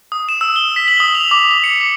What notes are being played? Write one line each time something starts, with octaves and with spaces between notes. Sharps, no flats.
D#6
E7
E6
G7
B6
F#7
D#6
F7
D6
D6
C#7
D6